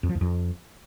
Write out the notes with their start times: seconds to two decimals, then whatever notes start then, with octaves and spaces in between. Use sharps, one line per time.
0.03 F2
0.09 F3
0.15 E2
0.21 F2